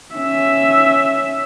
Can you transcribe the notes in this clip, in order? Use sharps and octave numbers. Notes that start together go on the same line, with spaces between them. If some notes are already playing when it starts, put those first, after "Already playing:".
C#4 E5